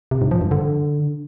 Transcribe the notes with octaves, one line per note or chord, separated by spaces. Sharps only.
C3
G#2
F3
G2
D3